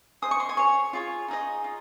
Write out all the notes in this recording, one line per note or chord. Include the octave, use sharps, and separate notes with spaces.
G#4 C5 D#5 D#6
C#6
C6
G#5
G#4 C#5 C#6
F4 G#4 C#5
D#4 G#4 D#5
F4